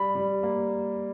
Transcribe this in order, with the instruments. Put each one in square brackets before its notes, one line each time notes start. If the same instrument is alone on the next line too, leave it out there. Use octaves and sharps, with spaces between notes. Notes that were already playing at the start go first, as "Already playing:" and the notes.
Already playing: [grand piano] G3 [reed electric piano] B5
[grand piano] G3
A#3